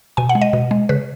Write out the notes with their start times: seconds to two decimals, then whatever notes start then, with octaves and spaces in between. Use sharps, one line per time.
0.17 B2 G#5
0.29 F#5
0.35 G#3
0.41 D#5
0.53 B2
0.71 G#3
0.89 C#3 B4